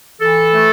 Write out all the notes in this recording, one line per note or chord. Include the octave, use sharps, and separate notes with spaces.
E3 A4
A3